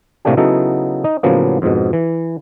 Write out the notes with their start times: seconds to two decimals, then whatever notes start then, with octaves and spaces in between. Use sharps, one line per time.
0.25 A2 C3 A3 A#3 D4 G4
0.37 C#3 F#3 B3 D#4 E4 A4
1.04 D#4
1.23 A2 C#3 F3 F#3 A#3 B3
1.62 F2 G#2 B2
1.93 E3